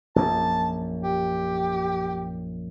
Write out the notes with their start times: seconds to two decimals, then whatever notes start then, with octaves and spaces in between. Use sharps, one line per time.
0.16 A#1 F#2 A5
1.03 G4